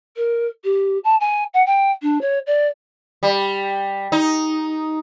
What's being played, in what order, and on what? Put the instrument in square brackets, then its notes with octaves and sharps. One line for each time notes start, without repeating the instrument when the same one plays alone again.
[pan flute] A#4
G4
A5
G#5
F#5
G5
D4
C#5
D5
[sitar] G3
D#4